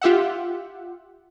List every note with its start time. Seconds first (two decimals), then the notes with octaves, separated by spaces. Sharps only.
0.02 F4 G4 E5 F#5